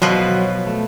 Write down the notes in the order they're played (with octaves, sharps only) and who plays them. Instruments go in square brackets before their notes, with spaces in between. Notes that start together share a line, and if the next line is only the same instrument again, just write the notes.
[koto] B2 F3 B4 [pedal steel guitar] F#3
[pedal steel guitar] A3